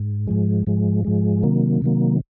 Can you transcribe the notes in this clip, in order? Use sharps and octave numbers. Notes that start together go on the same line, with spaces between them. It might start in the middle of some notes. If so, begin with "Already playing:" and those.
Already playing: G#2
G#2 F3 G#3
G#2 F3 G#3
G#2 F3 G#3
C3 D#3 F#3 A#3
C3 D#3 F#3 A#3